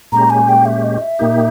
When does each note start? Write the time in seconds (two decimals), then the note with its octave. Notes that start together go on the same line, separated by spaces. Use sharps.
0.12 A#2 G#3 C#4 G4 A#5
0.30 G#5
0.48 G5
0.65 E5
0.84 D#5
1.01 E5
1.19 A#2 A#3 D#4 G4